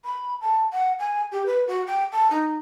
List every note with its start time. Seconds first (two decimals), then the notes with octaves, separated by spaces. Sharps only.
0.04 B5
0.41 A5
0.72 F#5
0.99 G#5
1.31 G4
1.45 B4
1.67 F#4
1.86 G5
2.12 A5
2.30 D#4